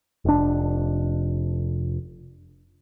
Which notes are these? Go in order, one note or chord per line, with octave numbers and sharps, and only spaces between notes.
F1 D4